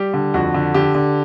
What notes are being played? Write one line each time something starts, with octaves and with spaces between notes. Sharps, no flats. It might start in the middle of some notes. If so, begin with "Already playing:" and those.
Already playing: G3 G4
D3
F2 F#4
D3
D3 G4
D3